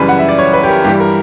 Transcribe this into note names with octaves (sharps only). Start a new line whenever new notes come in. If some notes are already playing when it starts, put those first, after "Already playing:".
Already playing: F#2 C#3 E3 G3 B4
F#5
E5
D5
C#5
B4
G4
A#4
G2 E3 G3 G4
A#4